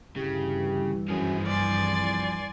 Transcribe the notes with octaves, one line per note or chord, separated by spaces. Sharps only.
D2 G2 C#3 E3 E4 G4
F#2 F3 G#4
C2 D5 G#5 C6